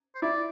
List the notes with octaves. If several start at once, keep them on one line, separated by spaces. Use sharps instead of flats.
C5
E4 D5